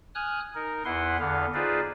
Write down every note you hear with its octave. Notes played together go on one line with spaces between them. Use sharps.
G#5 D#6 F6 F#6
D#4 A#4
E2 E4 B4 F#5 C6
E2 D3 B3 F5
D#4 F4 G#4 B4 C5 D5